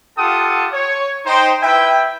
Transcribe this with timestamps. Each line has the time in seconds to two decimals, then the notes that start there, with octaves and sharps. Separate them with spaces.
0.17 F4 G4 A4 F#5 A5 D#6
0.72 C#5
1.26 D#4 C5 G5
1.63 E4 B4 E5 G5